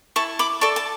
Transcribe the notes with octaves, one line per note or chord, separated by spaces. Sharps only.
E4 A5 C#6
B5 D6
A4 D5 A5 C#6
A5